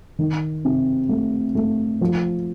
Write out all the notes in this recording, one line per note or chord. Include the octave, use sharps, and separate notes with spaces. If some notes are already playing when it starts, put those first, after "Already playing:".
D#3
C3
A3
A3
F3